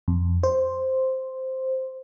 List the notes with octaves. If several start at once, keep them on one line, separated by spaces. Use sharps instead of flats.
F2
C5